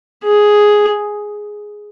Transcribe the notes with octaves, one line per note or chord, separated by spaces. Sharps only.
G#4